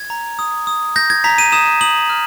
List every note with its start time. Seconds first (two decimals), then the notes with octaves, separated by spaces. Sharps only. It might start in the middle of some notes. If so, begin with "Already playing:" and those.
Already playing: G#6
0.10 A#5
0.39 D#6
0.67 D#6
0.96 G6 A#6
1.10 G#6
1.24 A#5 B6
1.38 D#7
1.52 D#6 E7
1.81 D#6 F#7
2.09 F6